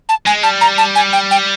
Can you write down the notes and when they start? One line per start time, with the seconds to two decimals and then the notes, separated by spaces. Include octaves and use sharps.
0.09 A5
0.26 G#3 G#5
0.43 G3 A5
0.61 A#5
0.78 A5
0.95 G#5
1.13 G5
1.31 G5